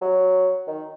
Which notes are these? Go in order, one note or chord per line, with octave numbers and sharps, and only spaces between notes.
F#3
D#3